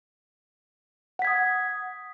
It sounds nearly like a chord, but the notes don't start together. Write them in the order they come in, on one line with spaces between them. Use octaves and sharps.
F#5 B6 G#6 D#6